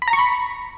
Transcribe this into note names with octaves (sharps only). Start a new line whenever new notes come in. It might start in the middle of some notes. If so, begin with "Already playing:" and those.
B5
A#5
C#6
B5